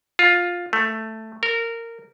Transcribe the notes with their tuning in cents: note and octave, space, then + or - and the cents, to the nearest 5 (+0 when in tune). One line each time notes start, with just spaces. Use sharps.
F4 +10
A3 +5
A#4 -15